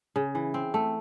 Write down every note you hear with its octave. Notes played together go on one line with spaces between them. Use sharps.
C#3
E3
C4
A3